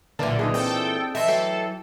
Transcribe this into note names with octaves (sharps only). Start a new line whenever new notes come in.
B1 A#2 D3 E3 A#3 D5 A5
D4 D#4 G#4
C4 A4 G5
E3 A3 D#5 E5 A5 C6
F#3 A4 G5 C7